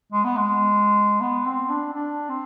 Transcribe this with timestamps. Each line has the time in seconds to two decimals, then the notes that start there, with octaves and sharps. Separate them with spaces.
0.12 G#3
0.24 B3
0.37 G#3
1.21 B3
1.45 C4
1.69 D4
1.93 D4
2.29 C4